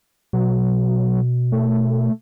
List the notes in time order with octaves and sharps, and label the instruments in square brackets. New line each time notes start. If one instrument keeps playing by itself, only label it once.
[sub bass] B2 [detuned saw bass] F#3
[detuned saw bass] A3